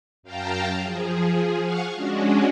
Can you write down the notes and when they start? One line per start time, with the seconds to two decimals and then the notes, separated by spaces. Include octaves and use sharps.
0.23 F#2 F5 G5 A5 A#5
0.83 F3 G#4
1.61 F5 F#5 G#5 C#6
1.95 G#3 C#4 D4 F#4